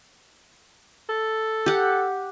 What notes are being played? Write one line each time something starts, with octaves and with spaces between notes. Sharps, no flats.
A4
G4 F#5